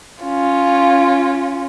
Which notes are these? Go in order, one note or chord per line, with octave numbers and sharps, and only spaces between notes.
C#4 F4